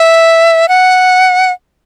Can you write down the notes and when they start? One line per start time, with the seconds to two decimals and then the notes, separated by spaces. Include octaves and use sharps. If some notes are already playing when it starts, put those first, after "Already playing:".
Already playing: E5
0.68 F#5